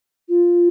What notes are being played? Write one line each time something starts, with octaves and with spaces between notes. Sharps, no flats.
F4